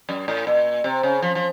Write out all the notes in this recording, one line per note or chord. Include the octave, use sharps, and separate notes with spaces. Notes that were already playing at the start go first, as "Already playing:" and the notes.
F#2
A2
A#2
C3
C#3
F3
F3